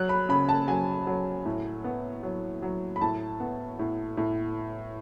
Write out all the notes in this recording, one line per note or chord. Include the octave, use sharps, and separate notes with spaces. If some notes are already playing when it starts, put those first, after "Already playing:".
Already playing: F#3 F#6
B5
C#3 B5
A5
F#3 G#5
F#3
A2
B3
F#3
F#3
B5
A2 A5
B3
A2
A2